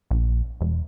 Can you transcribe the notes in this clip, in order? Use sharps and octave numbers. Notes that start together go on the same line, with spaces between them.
A#1
E1